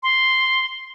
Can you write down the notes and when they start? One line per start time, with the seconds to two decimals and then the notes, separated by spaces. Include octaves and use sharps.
0.03 C6